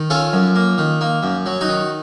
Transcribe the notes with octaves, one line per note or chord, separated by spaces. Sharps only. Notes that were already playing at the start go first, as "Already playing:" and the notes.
Already playing: D#3
C#4 F4 A4
F#2
A#3
D#3
A#3
F#2
F#3
D#4 F#4
D#3